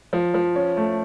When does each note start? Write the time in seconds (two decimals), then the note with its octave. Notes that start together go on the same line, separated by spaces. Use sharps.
0.13 F3
0.34 F3
0.56 C#4
0.77 A3